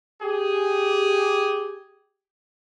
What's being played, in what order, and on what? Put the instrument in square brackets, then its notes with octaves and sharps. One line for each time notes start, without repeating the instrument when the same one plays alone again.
[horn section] G4 G#4